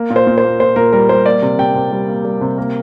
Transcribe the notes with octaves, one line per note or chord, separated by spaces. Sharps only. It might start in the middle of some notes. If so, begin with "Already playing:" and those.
Already playing: A#3
A#2
C5
A#2
C5
A#3
A#2 C5
A#2 A#4
G3 A#4
G3 C5
A#3 D5
C3
C3 G5
C3
G3
A#3
G3
C3
A#3